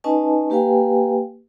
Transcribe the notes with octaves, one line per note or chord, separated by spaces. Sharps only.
C#4 D#4 B4 D#5 G#5 A5
A#3 G4 B4 F5 G5 G#5